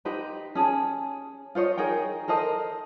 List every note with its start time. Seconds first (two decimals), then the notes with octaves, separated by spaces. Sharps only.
0.05 D#4 G4 B4 C5
0.55 C#4 G#4 A5
1.55 F4 C5 C#5 D#5
1.77 D#4 G#4 A#4 G5
2.28 A4 A#4 C5 D#5